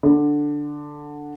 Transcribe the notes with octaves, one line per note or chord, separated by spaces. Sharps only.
D3